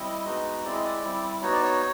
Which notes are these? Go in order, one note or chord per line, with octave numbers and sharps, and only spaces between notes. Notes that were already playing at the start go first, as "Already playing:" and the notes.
Already playing: G3 C4 E4 D#5
G#3 B3 D#4 F#4
G#3 C4 E4 D5
D#5
D5
G3 C4 E4
B3 D#4 F#4 C#5
D5
C#5